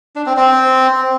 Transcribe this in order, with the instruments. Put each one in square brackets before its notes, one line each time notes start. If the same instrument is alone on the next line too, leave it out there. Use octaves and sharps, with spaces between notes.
[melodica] D4
C4
C4